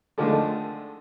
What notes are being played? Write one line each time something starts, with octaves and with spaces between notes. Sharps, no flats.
D3 D#3 F3 G#3 A3